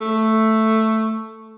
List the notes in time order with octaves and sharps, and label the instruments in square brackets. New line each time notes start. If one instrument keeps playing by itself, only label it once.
[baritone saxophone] A3